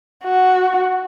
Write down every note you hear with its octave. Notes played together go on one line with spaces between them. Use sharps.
F#4